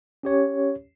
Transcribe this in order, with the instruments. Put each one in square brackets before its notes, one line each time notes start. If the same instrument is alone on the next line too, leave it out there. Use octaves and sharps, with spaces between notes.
[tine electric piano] C#4 G4 C#5